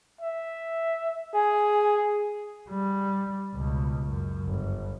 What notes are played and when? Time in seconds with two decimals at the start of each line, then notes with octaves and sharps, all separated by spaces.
0.21 E5
1.34 G#4 G#5
2.69 G3
3.56 C#2 B2
4.08 F#2
4.45 G1